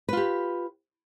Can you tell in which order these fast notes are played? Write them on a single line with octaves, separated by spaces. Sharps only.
B4 F4 G4